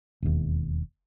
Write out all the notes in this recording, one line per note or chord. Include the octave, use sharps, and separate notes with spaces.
E1 D#2